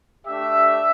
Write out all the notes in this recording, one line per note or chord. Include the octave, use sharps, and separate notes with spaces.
A3 D4 G4 E5